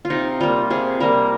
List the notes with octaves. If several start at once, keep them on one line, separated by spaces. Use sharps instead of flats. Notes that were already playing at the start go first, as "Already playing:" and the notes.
F4
C3 D#4
G3 A#3 F4
C3 G#4
G3 A#3 A#4